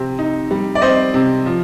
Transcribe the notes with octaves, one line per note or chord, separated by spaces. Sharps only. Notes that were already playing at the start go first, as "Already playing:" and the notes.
Already playing: C3 C4
D#4
G3
D5
C4 C5 D#5
C3
F3